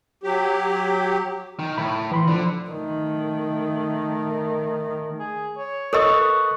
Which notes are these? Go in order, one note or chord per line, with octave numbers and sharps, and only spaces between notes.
F#3 G4
D#3
A2 B5
E3 B5 C6
D3 F3
D#3 A3
G#4
C#5
A4 A#4 C#5 D#5 C#6 D#6
B4